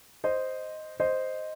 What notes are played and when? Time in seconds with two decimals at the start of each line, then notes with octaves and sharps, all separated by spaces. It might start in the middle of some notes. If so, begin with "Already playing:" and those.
0.24 C5 D#5
1.00 C5 D#5